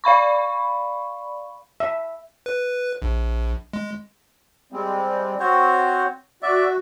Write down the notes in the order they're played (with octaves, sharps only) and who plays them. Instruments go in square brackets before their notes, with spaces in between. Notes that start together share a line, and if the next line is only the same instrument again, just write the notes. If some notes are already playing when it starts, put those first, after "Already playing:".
[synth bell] D5 F5 B5 C#6
[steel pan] E5
[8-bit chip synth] B4
A#1
G#3
[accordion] G3 G#3 C4
[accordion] C4 [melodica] F#4 C5 C#5
[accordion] F#4 [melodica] D5 E5